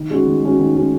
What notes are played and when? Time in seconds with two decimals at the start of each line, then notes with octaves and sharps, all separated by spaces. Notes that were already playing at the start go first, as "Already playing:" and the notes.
Already playing: D#3
0.10 G#3 C#4 F#4
0.26 D#3
0.43 G#3 C#4 F#4
0.59 D#3
0.75 G#3 C#4 F#4